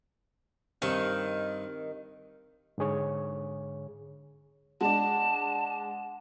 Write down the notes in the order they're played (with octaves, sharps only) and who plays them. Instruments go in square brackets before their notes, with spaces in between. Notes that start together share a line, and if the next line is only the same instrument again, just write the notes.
[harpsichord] G2 C4 C#6 [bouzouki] D#3
[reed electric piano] G#2 D3 G#4 C#5
[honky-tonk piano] G#3 D4 [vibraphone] F#5 [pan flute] A5